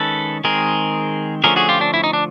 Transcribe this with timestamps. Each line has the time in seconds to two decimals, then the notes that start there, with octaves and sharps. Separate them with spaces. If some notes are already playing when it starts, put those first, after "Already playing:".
Already playing: D#3 G#3 C#4 A4 B4
0.44 D#3 G#3 C4 G#4 A#4
1.44 D3 F3 A3 C#4 G#4 A#4
1.56 F#4 G#4
1.69 F4 G4
1.81 D4
1.94 E4
2.04 D#4
2.13 D4